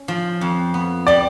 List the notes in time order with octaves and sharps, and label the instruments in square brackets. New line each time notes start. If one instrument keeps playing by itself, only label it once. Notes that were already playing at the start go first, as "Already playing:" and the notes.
Already playing: [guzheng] C#4
F3
F2
B3
[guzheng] G3 [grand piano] D5